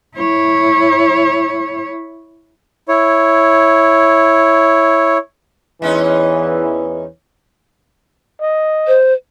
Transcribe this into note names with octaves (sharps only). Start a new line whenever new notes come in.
E4 C#5
E4 C#5
E2 E3 G#3 C#4 D#4
D#5
C5